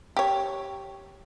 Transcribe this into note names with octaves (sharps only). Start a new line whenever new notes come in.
G4 C#5